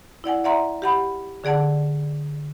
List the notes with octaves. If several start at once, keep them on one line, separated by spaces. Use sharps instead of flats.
E4 D5 F#5 G#5
D5 E5 F#5 A#5 C6
G4 F#5 B5
D3 G#4 D5 F#5 A5